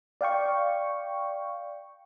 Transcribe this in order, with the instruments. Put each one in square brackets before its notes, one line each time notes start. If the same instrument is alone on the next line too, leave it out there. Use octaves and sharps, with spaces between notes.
[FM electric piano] D5 F5 G5 C#6